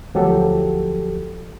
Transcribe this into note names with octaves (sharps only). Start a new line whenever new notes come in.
D2 F3 F#3 G4 A4